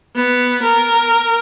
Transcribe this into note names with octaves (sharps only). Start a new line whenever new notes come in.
B3
A#4